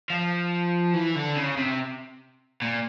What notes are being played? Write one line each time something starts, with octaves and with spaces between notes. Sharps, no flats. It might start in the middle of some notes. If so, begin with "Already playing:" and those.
F3
E3
D3
C#3
C3
A#2